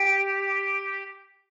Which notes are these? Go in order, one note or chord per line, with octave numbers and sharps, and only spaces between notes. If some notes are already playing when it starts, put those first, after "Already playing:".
Already playing: G4